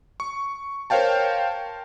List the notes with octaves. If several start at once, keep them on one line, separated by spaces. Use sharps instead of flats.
C#6
A#4 C5 C#5 F5 G5 A5